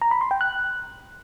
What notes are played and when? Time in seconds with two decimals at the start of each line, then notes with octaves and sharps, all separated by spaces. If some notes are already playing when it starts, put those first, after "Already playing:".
0.02 A#5
0.11 B5
0.21 C6
0.31 G5
0.41 F#6